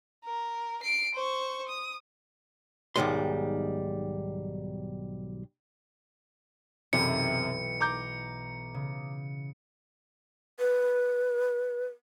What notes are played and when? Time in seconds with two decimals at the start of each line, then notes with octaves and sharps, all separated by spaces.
0.25 A#4
0.83 C7 D7
1.15 C5 C#6
1.69 D#6
2.96 B1 G#2 D#3 G3 G#3 C6
6.93 B1 F#2 C3 E3 G5 C#7
7.81 A#5 D6 G6
8.74 C#3
10.59 B4